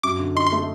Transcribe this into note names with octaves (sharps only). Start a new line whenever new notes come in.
F#2 D6
D3
D#4 C6
C6
A3